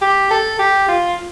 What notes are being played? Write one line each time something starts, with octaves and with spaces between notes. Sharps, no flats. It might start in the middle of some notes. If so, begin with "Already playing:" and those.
G4
A4
G4
F4